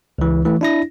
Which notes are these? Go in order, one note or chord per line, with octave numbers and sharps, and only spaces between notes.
C#2 E3
E3 A3
D4 E4 A#6